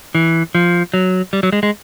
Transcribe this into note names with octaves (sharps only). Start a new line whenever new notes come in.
E3
F3
F#3
G3
F#3
G#3
G#3